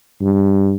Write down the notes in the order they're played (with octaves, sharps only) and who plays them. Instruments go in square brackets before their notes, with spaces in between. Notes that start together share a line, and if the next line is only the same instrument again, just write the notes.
[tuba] G2